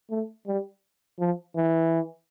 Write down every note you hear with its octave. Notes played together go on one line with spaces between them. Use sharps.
A3
G3
F3
E3